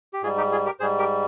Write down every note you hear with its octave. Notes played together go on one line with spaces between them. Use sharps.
G4
G#2 G3 F4 G#4
D#4 G4
F4 G#4
G4 A#4
G#2 G3 G#4 C5
G4 A#4